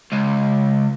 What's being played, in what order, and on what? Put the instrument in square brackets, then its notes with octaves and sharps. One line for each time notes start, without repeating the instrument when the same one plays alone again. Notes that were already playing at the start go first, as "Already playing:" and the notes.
[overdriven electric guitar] C#2